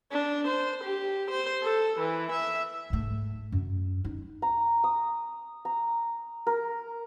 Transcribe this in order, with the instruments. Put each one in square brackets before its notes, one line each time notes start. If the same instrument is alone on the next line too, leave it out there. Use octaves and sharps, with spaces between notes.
[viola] D4
C5
G4
C5
A4
E3
E5
[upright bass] G#2 A3
F#2
D#4
[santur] A#5
D#6
A#5
A#4